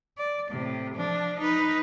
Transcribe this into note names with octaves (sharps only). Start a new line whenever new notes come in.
D5
A2 C3
F3 D4
D#4 B4